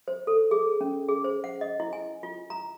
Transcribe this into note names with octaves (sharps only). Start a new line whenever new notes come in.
C5
A4
G#4
C#4
G#4
C5
F#5
D#5
E4
G#5
F4
A#5